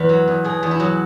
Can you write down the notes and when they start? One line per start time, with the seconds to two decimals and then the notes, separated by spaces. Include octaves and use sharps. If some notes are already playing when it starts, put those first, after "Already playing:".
Already playing: E2 B4
0.09 F#3
0.28 E2
0.44 B2 G#4
0.63 E2
0.71 E4
0.80 F#3